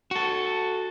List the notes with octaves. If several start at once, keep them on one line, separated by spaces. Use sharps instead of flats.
F#4 A4